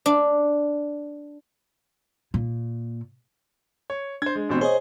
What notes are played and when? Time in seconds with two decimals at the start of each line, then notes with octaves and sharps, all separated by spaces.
0.06 D4
2.34 A#2
3.90 C#5
4.22 D4 C5 G#6
4.35 G#3
4.49 A1 B2 C4
4.61 G#4 C5 C#5 D#5